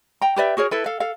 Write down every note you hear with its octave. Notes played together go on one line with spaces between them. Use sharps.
G5 A#5
G4 B4 D5 E5
F#4 G#4 A#4 C#5
E4 A4 B4
A4 F5
A4 F5